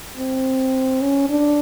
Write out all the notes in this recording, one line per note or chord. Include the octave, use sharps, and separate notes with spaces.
C4
C#4
D4